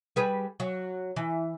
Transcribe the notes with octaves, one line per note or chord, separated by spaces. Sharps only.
G3 G#4 B4
F#3
E3